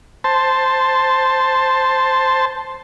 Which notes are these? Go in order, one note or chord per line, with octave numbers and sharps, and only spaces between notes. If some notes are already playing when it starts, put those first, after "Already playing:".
C5 A5